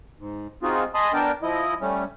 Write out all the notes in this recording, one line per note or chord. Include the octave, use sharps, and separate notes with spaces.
G#2
C4 D#4 F4 F#4 G#4
D#5 G#5 A5 B5 C6 D#6
B3 D4 A#4 G5 A5
F3 E4 D#5
G3 A3 C#4